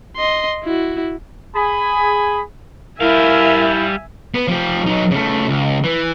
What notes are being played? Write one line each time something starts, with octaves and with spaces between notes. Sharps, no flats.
D#5 C6
E4 F#4
G#4 G#5 B5
G3 E4 A#4 E5 F5 G#5
B3
F3 G4
F#3 D#4
C#3 A3
C#2
E3